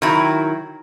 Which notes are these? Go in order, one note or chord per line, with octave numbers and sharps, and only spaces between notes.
D#3 F#3 E4